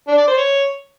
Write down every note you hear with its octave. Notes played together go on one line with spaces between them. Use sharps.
D4
D5
C5
C#5